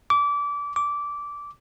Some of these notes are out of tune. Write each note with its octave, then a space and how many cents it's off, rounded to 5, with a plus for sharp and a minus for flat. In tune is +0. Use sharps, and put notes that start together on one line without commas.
D6 -25
D6 -15